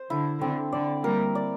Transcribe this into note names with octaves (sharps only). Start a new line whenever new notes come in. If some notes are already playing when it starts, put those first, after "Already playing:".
Already playing: C5
D3 E4
D3 C4
D3 D5
G3 A#3 A#4
D5